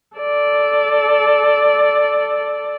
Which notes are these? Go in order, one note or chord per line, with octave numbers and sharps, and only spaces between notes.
A4 D5